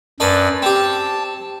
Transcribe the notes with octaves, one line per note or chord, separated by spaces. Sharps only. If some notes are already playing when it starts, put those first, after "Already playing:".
F#2 D4 B4 A5
C4 G4 A5